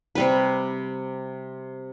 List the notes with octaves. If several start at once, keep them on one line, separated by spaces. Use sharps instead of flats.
C3 G3 B4